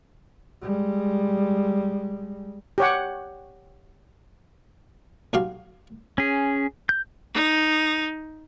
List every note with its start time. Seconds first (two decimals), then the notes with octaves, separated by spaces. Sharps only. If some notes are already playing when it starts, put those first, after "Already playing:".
0.62 G3 G#3
2.78 G4 C#5 F#5
5.33 B1 F#4 G4 F5 C6
6.18 C#4 G#4
6.89 G6
7.34 D#4